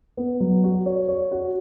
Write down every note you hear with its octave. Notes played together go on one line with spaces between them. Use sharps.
B3
F#3
F#4
C#5
C#5
F#4